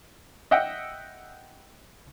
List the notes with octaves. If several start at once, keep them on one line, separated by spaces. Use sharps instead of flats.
D#5 E5 F#5 G5